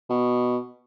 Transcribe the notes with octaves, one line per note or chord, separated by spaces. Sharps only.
B2